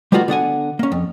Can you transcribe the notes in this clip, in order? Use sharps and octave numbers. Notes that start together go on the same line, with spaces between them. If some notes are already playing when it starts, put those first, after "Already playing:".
G3 A3 B3 D#4 F4 F#4
D3 B3 F#5 G#5
A#3 C#4
F2